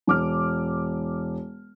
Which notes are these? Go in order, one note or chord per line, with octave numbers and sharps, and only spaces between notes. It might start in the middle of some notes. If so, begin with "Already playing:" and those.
E1 D6 F6